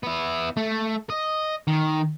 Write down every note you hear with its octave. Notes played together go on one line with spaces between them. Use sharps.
B3 E4
A3
D#5
D#3